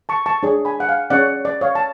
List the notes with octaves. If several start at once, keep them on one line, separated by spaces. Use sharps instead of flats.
A5 C#6
A5 C#6
D4 G#4 C#5
G#5 B5
F#5
F5 G#5
C#4 G#4 C#5 D5 F#5
C#5
D5
C#5 F5
A5